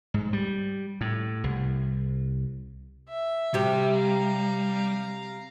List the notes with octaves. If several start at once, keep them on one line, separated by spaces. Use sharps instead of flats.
G#2
G3
A2
C2
E5
C3 G3 G4
F5 A#5